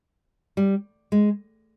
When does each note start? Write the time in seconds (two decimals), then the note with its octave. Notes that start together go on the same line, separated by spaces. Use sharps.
0.57 G3
1.12 G#3